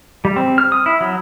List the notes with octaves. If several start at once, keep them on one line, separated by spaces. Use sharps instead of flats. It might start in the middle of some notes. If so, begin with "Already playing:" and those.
G3
C4
F6
D#6
E4
F#3